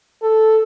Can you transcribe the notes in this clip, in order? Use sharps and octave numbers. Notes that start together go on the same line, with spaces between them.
A4